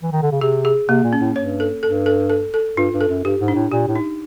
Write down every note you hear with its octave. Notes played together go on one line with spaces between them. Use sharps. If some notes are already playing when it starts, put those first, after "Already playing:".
E3
D#3
D3
C#3
C3 G#4
G#4
C3 A#3
A#2
C#4
A2
G2 C#5
A4
G2 A4
A4
A4
A4
G2 F4
G2
A4
F#2
G2 G4
G#2
D4
A2
A#2 G4
A2
D#4